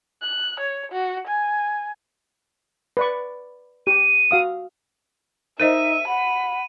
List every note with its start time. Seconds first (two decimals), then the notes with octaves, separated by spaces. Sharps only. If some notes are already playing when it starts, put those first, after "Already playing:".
0.22 F#6
0.60 C#5
0.92 F#4
1.27 G#5
2.97 B4 D5 C#6
3.87 G4 D#7
4.31 F#4 F5 D#6
5.60 D#4 A#4 C5 D#5 E5 D#7
6.08 F#5 B5